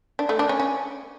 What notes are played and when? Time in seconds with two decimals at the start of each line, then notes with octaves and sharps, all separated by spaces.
0.19 D4
0.29 A3
0.39 D4
0.49 C#4
0.60 C#4